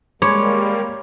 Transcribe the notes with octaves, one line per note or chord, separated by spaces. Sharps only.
G3 G#3 A#3 C#5 B5 C6 D6